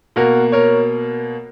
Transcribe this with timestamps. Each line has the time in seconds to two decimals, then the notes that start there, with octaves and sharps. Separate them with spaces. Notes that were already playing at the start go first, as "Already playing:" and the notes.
0.16 B2 A#3 F#4 A#4
0.52 A#4 C#5